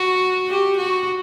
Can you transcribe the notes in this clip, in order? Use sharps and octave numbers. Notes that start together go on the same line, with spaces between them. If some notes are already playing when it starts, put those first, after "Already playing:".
Already playing: F#4
G4
F#4